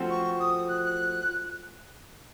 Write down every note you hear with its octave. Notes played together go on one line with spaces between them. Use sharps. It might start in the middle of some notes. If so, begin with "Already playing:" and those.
Already playing: F3 A3 C4 F#4
C#6
D#6
F#6
F#6